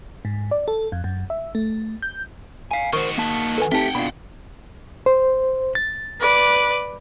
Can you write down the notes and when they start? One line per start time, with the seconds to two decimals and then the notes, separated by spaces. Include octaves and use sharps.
0.25 G#2
0.51 D5
0.68 A4
0.92 F2
1.04 F#2
1.30 E5
1.55 A3
2.02 G6
2.71 F5 G#5
2.93 D#3 F#4 A#4 C5 C#6
3.18 A#3 A5
3.58 A4 B4 G#5
3.72 A3 C4 D#4 G4 F#5 G5 A5
3.95 B2 D4 F4 B5
5.06 C5
5.75 A6
6.20 B4 D5 D6